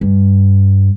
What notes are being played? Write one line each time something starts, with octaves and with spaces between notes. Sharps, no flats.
G2